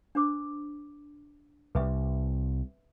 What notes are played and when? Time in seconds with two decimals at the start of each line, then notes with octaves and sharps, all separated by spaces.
0.15 D4 C5 D6
1.75 C2 B4 E5